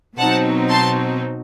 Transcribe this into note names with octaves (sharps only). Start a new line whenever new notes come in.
B2 F#3 C4 D#4 F#5 A5
A5 C6